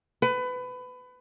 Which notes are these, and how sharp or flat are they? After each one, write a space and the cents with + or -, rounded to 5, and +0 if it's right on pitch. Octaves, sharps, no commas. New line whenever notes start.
B4 +25